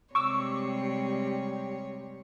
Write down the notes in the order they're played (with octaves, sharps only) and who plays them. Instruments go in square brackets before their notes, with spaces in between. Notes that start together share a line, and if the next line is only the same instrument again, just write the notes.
[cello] C3 G#3 [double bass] G3 [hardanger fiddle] C#5 [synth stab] C#6 D6 E6